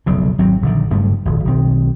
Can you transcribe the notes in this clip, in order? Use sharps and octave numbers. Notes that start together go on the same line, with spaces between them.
F1 B1 F#2 C#3
G#1 F#3 C4
A#1 D3 D#3
F#1 G2 G3 A3
D#1 G#1
B1 D#3 C4